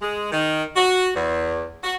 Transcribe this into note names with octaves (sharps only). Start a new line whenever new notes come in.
G#3
D#3
F#4
E2
F#4